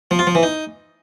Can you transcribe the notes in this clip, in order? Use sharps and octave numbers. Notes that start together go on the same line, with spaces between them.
F3
F4
F3
E3
D#4